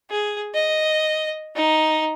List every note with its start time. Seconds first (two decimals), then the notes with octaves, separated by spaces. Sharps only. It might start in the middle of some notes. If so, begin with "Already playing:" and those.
0.10 G#4
0.54 D#5
1.55 D#4